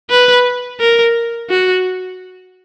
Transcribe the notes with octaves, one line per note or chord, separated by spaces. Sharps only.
B4
A#4
F#4